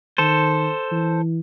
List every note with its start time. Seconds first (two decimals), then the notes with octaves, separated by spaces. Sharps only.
0.18 D#3 A4 C5
0.92 E3